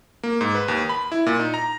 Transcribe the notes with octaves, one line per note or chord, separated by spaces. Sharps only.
A#3
G#2
B4
D#2
B5
E4
A#2
D#4
A#5